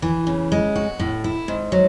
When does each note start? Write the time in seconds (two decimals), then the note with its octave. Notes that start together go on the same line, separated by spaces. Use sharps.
0.02 E3
0.27 C#3
0.52 G#3
0.76 F#4
0.99 A2
1.24 E4
1.48 G#2
1.72 F#3